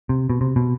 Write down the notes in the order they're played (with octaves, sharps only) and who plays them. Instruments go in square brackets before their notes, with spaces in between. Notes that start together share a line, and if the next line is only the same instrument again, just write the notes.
[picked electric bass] C3
B2
C3
B2